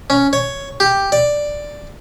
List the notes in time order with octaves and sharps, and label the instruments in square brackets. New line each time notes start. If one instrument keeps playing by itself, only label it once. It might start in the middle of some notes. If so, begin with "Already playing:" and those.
[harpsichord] C#4
C#5
G4
D5